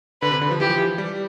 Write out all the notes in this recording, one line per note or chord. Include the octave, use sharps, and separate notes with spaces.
D3 B4
C3
D3
F3
E3 G4
F3
E3
G3